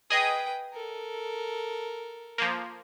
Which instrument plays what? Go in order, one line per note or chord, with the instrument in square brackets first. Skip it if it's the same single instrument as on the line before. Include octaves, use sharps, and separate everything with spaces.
[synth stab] G#4 D#5 D#6 [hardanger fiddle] B4 G5
[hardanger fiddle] A4 A#4
[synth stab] F3 A#3